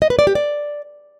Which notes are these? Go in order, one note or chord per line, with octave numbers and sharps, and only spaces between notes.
D#5
B4
D5
G4
D5